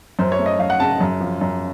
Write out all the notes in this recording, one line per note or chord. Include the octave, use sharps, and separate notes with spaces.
F#2 C5
C#5
A3
D#5
F#2 F5
F#5
C#3 A5
F#2
F3
F#2